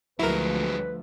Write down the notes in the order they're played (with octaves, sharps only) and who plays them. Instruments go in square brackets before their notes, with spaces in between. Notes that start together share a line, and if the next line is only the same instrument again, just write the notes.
[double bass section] D2 F3 A3 [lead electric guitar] F#3 G#3 [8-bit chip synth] E4 A#4 [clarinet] B4